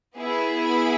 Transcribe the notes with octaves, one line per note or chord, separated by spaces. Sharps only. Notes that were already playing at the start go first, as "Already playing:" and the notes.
B3 E4 G#4
B5